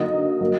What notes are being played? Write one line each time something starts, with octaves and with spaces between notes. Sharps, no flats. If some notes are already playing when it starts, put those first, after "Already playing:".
Already playing: D3 F#3 A#3 D#4 D#5
F#3 A#3